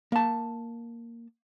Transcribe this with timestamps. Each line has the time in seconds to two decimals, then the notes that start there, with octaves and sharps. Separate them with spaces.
0.12 A#3 A5